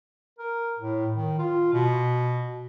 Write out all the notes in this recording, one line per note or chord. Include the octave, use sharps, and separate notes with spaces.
A#4
A2
D#3
F4
B2